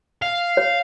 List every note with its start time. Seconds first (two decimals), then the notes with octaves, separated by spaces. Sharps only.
0.22 F5
0.57 C#5